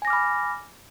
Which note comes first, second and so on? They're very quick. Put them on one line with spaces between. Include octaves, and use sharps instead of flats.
G#5 A#6 D6 F6 B5